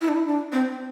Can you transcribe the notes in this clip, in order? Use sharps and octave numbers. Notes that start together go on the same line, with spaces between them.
E4
D4
E4
D4
C4